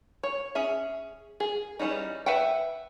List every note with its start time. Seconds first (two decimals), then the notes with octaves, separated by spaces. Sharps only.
0.23 C#5
0.55 C#4 G#4 E5
1.40 G#4
1.79 E3 G3 C#4 D#4
2.26 B4 E5 F#5 G5